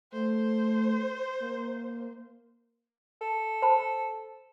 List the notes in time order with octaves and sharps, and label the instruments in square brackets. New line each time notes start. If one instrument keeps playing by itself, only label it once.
[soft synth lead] A3 [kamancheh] C5
[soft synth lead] A#3
[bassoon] A4
[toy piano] C5 A5 B5